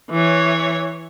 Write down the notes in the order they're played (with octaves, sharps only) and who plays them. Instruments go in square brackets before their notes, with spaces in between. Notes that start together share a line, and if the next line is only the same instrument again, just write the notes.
[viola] E3 C#5